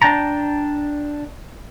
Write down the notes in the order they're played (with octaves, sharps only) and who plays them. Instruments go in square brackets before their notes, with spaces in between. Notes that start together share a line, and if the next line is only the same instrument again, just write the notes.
[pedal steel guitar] D4 G5 A5 A#5